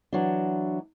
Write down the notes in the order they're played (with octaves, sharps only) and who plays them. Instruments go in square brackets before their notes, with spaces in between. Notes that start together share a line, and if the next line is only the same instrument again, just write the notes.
[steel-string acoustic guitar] E3 F#3 D4